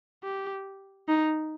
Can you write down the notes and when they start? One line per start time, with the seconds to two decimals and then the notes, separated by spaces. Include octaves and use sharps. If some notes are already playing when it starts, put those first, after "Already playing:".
0.24 G4
1.08 D#4